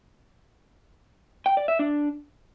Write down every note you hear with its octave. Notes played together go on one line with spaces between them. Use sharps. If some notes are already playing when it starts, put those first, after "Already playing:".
G5
D5
E5
D4